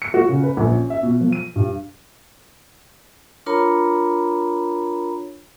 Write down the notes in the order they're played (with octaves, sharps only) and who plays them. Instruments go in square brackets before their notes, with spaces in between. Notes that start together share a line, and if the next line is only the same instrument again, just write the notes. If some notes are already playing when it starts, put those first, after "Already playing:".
[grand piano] C#7
F#4
C#3
B4
A#1
C#4
E5
B2
F3
D#7
G2
[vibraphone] D4 F4 A#4 C#5 A#5 B5